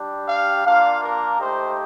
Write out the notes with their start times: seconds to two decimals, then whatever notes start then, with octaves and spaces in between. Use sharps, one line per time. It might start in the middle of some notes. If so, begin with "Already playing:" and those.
Already playing: G3 D4 G4
0.28 F5
0.65 A#3 D4 F4 F5
1.02 A#4
1.40 A3 D#4 G4 C5